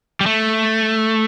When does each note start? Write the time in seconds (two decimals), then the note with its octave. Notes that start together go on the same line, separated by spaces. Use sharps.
0.21 G3
0.26 A3